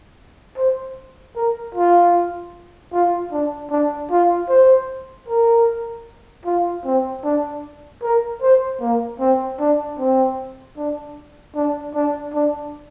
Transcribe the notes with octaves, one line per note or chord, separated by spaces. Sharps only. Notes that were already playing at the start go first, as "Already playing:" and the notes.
C5
A#4
F4
F4
D4
D4
F4
C5
A#4
F4
C4
D4
A#4
C5
A#3
C4
D4
C4
D4
D4
D4
D4